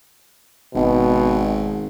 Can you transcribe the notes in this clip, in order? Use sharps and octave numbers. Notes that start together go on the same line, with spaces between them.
G#1 B2